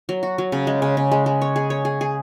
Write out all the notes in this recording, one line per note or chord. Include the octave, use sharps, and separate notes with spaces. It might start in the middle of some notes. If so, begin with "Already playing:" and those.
F#3
F#4
F#3
C#3
G#3
C#3
C#3
G#3
G#3
C#5
G#4
C#5
G#4
G#4